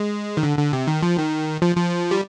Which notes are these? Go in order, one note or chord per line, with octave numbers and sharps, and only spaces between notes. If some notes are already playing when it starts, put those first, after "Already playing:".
Already playing: G#3
D#3
D3
D3
C3
D#3
F3
D#3
F3
F3
G3